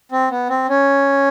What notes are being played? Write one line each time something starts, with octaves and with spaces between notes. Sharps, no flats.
C4
B3
C4
C#4